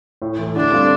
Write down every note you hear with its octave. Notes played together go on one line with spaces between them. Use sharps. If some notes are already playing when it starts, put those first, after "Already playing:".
A2
E3 A3
D3 D4
G3 C4 F4 A4